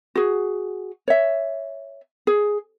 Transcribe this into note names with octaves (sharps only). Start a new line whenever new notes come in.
F#4 G#4
C#5 E5
G#4